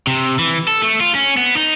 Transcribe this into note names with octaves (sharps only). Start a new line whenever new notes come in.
C3
E3
A4
A3
F4
C#4
B3
D#4